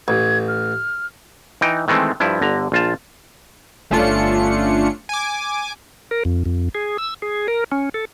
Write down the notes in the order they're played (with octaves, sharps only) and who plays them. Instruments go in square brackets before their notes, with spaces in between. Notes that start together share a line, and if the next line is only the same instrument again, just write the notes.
[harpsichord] A1 [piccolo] G#6
[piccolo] F6
[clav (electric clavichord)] E3 D#4 G5
D#3 E3 G#3 A3 C4
G2 F3 E4
G1 D3 A#5
A#1 F4 A5
[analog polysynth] G1 A3 C#4 D4 F4 C#7
G#5 D6
[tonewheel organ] A#4
F2
F2
G#4
E6
G#4
A#4
C#4
A4